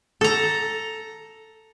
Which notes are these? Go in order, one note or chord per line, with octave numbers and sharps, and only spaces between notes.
A4 A#5